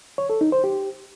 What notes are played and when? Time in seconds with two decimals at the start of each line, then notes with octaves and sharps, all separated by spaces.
0.18 C#5
0.30 A4
0.41 D#4
0.52 C5
0.64 G4